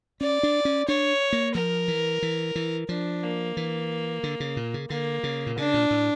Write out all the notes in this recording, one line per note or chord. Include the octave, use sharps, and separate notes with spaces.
C#4 D5
D4
C#4
D4 C#5
A#3
F3 A#4
E3
E3
E3
F3 D4
A#3
E3
D3
C#3
A#2
C#3
D3 A#3
C#3
A#2
C#3 D4
A#2
A2